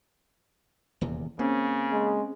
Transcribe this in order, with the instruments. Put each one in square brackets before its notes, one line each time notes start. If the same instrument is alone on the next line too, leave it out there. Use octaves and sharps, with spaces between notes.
[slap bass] D#1 E2 C3
[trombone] C#3 [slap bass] A#3 [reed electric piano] C4 C#4
[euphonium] G#3